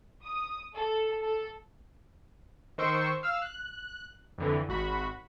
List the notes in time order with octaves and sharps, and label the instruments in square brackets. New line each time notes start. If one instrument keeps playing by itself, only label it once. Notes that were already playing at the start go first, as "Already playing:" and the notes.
[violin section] D#6
A4
A4
[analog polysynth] D#3 C5 C#6 E6 D7
F5 E6 F6
F#6
F2 D3 E3
G#1 F#4 B5